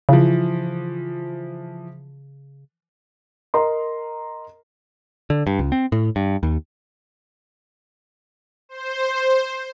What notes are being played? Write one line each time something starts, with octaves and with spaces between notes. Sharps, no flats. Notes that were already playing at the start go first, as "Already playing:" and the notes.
C#3 E3 F3
A#4 D#5 A#5 C6
D3
G2
C#2
C4
A2
G2
D#2
C5